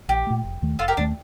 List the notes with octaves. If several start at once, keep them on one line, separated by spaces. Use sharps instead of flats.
A#1 G4
A#2 A3
F1
D#2 D#3 A3
F1 F4 A4
G4 A#4
D#2 D#3 A3 D4